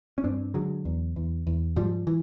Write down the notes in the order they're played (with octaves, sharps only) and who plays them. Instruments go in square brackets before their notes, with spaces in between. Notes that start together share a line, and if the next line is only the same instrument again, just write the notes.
[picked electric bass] C#4
G2 C4 D4
D3 F#3 G#3
E2
E2
E2
G#2 F3 G3
E3